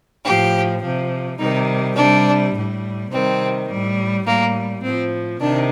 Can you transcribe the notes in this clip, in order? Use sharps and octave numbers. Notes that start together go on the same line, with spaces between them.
A2 F3 G4
C3 F3
C3 D#3 G3 D#4
C3 G3 D4
A2 G3
C3 D#3 G3 C4
A2 G3
A2 G3 A#3
A2 F3 C4
C3 D#3 D4